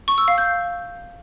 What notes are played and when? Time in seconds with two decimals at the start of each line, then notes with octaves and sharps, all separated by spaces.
0.08 C#6
0.18 E6
0.28 F5
0.38 G6